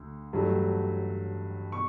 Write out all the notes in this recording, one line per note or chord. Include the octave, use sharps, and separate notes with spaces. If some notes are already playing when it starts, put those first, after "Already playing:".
Already playing: D2 D3
A1 G2 F#3 A3
B2 C#6